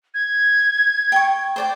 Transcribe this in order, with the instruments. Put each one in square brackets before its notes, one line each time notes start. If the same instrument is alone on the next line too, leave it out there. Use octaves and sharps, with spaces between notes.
[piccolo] G#6
[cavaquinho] G5 G#5 C#6
C5 D5 G5